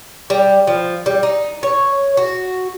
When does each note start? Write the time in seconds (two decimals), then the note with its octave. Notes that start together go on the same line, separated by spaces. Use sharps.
0.30 G3
0.67 F3
1.06 G3
1.23 D#4
1.63 C#5
2.17 F#4